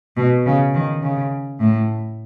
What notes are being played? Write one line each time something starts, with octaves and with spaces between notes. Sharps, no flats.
B2
C#3
D#3
C#3
A2